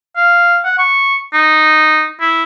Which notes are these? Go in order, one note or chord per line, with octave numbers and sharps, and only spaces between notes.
F5
F#5
C#6
D#4
E4